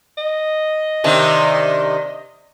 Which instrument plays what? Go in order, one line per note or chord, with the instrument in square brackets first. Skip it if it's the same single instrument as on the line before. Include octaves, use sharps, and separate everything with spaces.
[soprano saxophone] D#5
[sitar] C3 D#3 D4